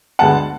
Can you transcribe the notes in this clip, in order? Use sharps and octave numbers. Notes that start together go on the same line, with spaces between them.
D2 D3 G#3 B3 F#5 A5